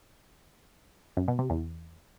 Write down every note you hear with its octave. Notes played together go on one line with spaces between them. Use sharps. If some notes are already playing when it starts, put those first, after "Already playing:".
F#2
B2
C3
E2